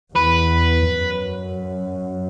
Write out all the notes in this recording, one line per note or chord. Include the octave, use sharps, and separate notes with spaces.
E2 B4
F#2